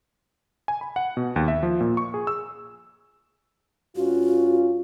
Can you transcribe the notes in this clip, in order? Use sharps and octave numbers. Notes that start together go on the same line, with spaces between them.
G#5
B5
F#5
B2
D#2
E5
F3
A#2
C#6
G#4
E6
G2 C#4 F4 F#4